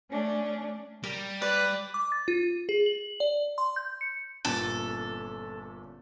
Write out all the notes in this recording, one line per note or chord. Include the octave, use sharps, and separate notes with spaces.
A3 C#4 D4
G3 A#4
B4 D5
D6
A6
F4
G#4
F#7
D5
C6
G6
C#7
G1 A#2 C#4 A4